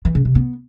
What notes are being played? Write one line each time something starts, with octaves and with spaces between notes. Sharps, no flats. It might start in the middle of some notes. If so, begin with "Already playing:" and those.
E3
C#3
C3
B3